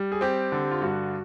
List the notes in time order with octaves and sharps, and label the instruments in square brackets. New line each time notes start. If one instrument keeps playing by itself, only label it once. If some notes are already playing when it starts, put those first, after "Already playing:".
Already playing: [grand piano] G3
G#4
C4 G4
D3
F4
G2 F#4